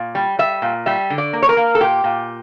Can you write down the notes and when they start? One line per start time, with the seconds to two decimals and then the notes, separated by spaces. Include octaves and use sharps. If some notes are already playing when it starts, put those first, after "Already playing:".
Already playing: A#2
0.15 G3
0.39 G3 E5
0.62 A#2
0.86 G3 E5
1.10 D3
1.18 D5
1.33 A#3
1.42 C#5
1.49 A#4
1.57 A#3
1.75 A4
1.81 A#2 G4
2.04 A#2